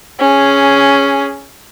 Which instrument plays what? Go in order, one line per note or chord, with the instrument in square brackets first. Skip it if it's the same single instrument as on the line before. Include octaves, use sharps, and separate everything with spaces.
[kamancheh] C#4 G#4